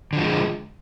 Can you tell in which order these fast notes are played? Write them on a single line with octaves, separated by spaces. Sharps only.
D3 F3 G#3